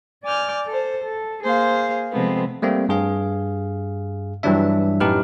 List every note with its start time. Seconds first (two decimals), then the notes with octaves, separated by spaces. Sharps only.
0.24 D5 G#5 D6 F6 G6
0.66 A4 C5
1.03 A4
1.42 A#3 G#4 C5 F5
2.12 C3 F3 G#3 A3 B3 C4
2.62 G3 A3 A#3 C4
2.89 G2 G#4 F5
4.43 G2 E3 F#3 G3 D4 E5
5.00 F#2 A2 D#4 G4 B4 F6